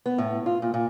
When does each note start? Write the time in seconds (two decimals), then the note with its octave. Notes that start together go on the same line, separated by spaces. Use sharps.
0.06 B3
0.18 A2
0.46 F4
0.62 A#2
0.74 A#2